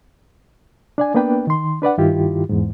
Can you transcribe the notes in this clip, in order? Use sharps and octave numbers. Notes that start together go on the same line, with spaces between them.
D4 D5 G#5
A#3 B3 D4 B4 G5
D#3 C6
D4 B4 D5 F#5
G2 D#3 E4 F4 G4
E2 G#2